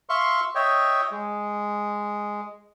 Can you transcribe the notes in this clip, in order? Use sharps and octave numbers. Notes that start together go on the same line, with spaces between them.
E5 F5 C6 C#6
C#5 D#5 E5 G5
G#3